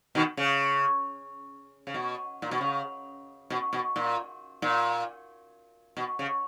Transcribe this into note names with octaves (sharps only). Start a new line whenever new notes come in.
B2 D#3
C#3
C#3
B2
A#2
B2
C#3
B2
B2
A#2
A#2
B2
C#3